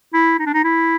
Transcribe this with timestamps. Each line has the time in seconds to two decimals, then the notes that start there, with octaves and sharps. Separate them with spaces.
0.14 E4
0.39 D#4
0.46 D4
0.54 D#4
0.64 E4